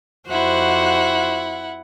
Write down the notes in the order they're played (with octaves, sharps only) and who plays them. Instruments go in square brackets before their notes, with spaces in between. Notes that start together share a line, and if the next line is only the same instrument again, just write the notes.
[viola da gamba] F2 F#4 C5 [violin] E4 F#5